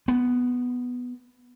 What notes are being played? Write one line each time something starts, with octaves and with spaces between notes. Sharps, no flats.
B3